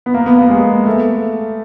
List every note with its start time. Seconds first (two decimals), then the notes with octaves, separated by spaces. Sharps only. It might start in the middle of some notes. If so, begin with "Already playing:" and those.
0.06 B3
0.14 A#3
0.26 B3
0.38 A#3
0.50 G#3
0.86 A3